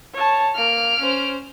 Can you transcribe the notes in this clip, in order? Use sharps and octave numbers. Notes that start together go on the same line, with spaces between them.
C#5 A5
A#3 F6 D7
C#4 C5